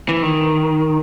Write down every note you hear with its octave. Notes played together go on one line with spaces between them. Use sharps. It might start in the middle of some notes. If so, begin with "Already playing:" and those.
E3
D#3